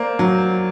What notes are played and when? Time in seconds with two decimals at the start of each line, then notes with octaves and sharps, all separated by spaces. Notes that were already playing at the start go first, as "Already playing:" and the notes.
Already playing: A#3 C5 D5
0.19 F#3